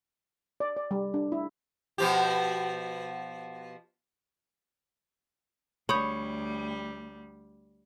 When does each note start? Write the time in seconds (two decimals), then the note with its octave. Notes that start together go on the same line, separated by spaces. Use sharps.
0.60 D5
0.77 D5
0.91 G3
1.14 D4
1.32 E4
1.98 B2 F3 G4
5.89 D2 G3 C#5 B5 D#6 G6